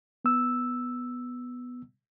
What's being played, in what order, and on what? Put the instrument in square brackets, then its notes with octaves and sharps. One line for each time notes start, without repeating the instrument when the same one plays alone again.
[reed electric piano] B3 E6